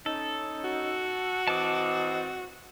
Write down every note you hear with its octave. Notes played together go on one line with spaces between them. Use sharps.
C#4 D#4 A4
F#4
E3 C4 D#5 A5 D6